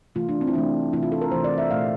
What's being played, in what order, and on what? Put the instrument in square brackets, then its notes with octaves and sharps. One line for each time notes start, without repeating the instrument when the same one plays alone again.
[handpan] C3 E3 A3 F4
D4
C4
E4
C3 E3 A3 D4
C3 E3 A3 E4
F4
A4
A#4
C3 E3 A3 C5
D5
E5
A#2 A3 F5